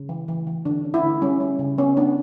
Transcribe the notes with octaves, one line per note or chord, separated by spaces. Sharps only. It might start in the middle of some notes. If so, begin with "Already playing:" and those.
Already playing: C#3
E3
E3
E3
D3 D4
C#4
E4
D3
G3 C#4
C#4
C#3
B3 C#4
B3 D4